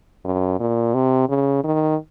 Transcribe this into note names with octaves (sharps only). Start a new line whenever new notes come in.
F#2
A#2
C3
C#3
D#3